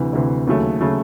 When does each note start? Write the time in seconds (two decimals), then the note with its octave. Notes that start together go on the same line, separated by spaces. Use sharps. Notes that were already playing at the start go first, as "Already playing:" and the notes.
Already playing: D2 C3 E3
0.13 D2 C3 E3
0.47 D#2 C#3 F#3 A3
0.81 C#3 F#3 A3